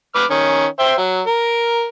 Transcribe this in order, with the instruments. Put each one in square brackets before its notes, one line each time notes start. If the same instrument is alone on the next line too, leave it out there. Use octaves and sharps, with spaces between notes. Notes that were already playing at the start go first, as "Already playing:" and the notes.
[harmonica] B4 D6 F6
D#3 C#4
C5 E5 G5
F#3
A#4